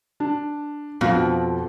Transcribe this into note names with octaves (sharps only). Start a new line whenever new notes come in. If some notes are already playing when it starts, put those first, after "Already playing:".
D4
F2 B2 F3